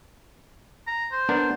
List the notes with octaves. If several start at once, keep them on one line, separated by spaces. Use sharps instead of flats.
A#5
C5
B3 D4 A#4